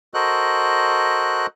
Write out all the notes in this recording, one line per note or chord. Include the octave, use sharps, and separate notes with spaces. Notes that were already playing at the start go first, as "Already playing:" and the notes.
F#4 A4 A#4 C5 D#5 F#6